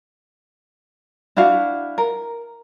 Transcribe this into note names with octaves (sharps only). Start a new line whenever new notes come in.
D4 E4 F#4 F5
A#4